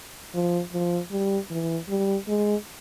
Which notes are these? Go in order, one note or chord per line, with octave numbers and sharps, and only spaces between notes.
F3
F3
G3
E3
G3
G#3